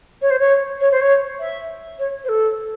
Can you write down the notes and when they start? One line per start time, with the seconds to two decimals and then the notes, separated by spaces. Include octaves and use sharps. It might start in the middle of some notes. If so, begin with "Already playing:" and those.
0.22 C#5
0.30 C5
0.39 C#5
0.81 C#5
0.92 C5
1.01 C#5
1.40 E5
1.99 C#5
2.24 C5
2.29 A4